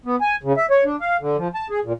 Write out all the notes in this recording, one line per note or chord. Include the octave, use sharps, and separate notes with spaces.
B3
G#5
C#3
E5
C#5
D4
F5
D3
F3
A5
G#4
A#2